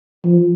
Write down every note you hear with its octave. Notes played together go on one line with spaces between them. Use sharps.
F3